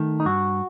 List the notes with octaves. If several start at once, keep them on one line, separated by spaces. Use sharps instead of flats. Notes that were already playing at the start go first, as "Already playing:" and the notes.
Already playing: D#3 A3
D#4
G2 F#4